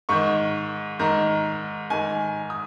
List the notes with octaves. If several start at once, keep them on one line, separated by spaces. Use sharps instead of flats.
G#2 D#3 C#6
G#2 D#3 A#5
G#2 D#3 G#5
D#6